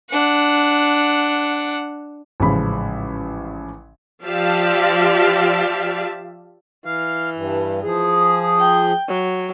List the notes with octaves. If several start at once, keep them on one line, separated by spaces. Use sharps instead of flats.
D4 F#5
A1 G#2 C#3 F3 B5
F3 G4 D5 E5 F5 A5
E3 F5
G2
F3 G#4
G5
F#3